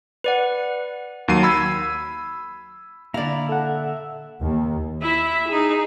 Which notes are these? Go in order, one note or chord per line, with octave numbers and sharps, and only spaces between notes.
B4 D5 F#5
D#2 F#3 C7 D#7
B5 E6 G#6
A#2 D3 E4 D5 F5 A#5
A4 E5 F#5
D#2
E4 E5
D#4 G#4